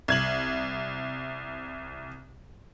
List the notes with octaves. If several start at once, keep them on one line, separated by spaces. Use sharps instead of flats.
C2 G#6 F#7